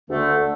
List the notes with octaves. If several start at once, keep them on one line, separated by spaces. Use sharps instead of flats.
D2 D3 A3